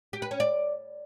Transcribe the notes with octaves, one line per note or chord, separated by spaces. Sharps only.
G4
B4
C#4
D5